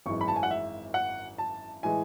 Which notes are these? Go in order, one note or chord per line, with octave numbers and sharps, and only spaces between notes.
G#1 F#2 E3 G#3 C#6
B5
A5
G#5
F#5
E5
F#5
A5
A2 E3 G#3 G#5